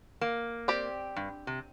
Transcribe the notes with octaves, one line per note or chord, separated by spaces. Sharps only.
A#3
C4 G4 D5
G2
C3